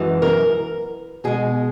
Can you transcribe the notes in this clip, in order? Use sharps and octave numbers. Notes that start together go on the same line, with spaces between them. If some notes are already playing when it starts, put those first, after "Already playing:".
Already playing: F#2 E3 G#3
A#4
B2 G#3 G#4